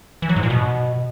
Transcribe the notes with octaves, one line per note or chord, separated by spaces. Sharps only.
E3
F#3
G#2
A#2
B2